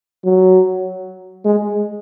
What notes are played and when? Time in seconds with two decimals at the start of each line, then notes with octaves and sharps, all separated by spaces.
0.24 F#3
1.45 G#3